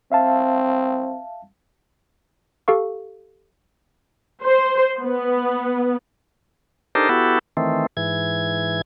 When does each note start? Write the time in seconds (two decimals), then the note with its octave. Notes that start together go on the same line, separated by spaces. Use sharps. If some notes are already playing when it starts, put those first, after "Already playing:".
0.12 C4 E5 F5 A5
2.68 G4 A4 F5 C#6
4.44 C5
5.02 B3
6.95 D4 D#4 G4 A4 A#4 C5
7.09 B3 E4 F#4 G4 A4
7.57 D#3 E3 A3 C4
7.97 G#2 E3 G#6